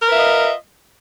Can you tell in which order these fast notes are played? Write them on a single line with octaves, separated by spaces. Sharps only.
A#4 B4 E5 F4 D#5